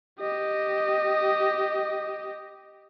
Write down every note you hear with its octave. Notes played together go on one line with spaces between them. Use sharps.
G4 D#5